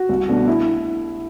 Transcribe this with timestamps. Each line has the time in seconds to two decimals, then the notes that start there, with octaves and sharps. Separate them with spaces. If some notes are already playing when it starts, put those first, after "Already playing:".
Already playing: F#4
0.09 C2
0.28 B2 A3 D4
0.47 E4